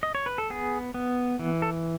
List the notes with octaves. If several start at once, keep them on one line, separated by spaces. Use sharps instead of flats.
D#5
C#5
B4
A4
B3 G#4
B3
E3
A4